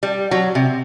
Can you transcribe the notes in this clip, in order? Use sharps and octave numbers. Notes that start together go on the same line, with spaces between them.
G3
F#3
C3